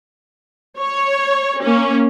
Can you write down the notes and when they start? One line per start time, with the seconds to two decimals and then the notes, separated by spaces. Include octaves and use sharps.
0.79 C#5
1.62 A#3 C#4